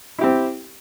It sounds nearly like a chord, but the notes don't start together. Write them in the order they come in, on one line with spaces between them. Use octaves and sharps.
E4 G4 C4